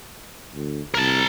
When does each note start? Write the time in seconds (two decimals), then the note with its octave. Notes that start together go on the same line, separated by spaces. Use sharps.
0.54 D2
0.94 C2 A#4 A5